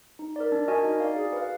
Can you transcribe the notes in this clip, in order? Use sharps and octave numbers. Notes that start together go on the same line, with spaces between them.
D#4
A#4 D5
D4
F#4 A#4 D#5 G#5
D#4
F#4 D5 F5
G#4
B4 F5